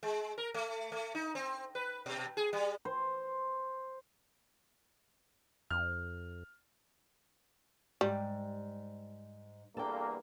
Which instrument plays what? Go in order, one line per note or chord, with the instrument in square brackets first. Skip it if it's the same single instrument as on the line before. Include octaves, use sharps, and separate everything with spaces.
[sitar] G#3
A#4
A3
A3
D#4
C4
B4
B2
G#4
G3
[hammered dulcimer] C5
[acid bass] F2 [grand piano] F6
[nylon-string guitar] G#2 [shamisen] G3
[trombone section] E2 G2 A#3 [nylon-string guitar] A4 G5